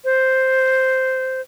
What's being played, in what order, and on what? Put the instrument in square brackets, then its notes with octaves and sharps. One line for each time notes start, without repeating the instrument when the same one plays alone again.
[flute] C5